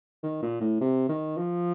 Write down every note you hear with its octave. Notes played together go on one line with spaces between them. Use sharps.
D#3
A#2
A2
C3
D#3
F3